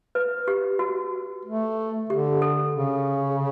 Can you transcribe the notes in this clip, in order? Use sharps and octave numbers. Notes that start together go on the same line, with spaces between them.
B4
G4
F#4
A3
D3 G4
A4
C#3